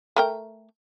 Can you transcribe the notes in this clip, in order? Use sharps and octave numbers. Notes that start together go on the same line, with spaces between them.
A3 A#4 G5